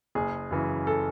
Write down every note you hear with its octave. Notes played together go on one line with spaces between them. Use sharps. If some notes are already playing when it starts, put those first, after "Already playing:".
F#1 G#4
F#2 C#3 E3
A4